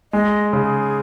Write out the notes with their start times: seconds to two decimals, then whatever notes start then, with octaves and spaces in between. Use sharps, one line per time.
0.13 G#3 D#5
0.52 C#3 G#4